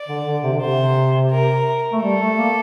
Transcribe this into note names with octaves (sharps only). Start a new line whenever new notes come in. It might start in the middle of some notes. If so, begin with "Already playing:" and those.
Already playing: D5
D3
D3
C3
D3
C3 C5
A#4
A3
G3 A4
A3
A#3